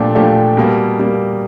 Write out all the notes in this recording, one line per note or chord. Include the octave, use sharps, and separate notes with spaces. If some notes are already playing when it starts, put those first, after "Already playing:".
Already playing: A#2 F3 A3 D4 G4
A#2 F3 A3 D4 G4
B2 G3 A#3
B2 G3 A#3